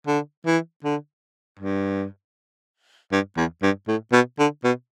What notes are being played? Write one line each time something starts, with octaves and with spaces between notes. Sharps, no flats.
D3
E3
D3
G2
G2
E2
G2
A2
B2
D3
B2